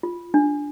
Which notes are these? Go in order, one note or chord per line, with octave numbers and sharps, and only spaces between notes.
F4
D4